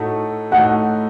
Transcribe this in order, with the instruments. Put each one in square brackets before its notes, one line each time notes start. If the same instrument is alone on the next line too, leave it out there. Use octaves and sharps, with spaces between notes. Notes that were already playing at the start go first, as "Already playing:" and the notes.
Already playing: [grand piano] A2 A3 D#4 F#4
[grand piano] A2 A3 D#4 F#4 [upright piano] F#5